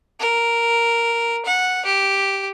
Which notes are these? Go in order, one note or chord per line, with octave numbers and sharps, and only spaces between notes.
A#4
F#5
G4